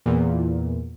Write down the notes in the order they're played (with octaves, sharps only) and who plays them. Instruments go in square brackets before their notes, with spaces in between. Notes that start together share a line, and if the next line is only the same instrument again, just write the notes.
[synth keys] E2 A#2